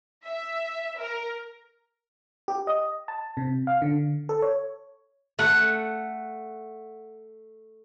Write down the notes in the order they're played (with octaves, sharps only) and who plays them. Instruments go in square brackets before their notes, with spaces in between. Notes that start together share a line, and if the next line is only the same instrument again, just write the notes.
[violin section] E5
A#4
[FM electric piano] G4
D#5
A5
C3
F5
D3
A4
C#5
[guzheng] A3 F#5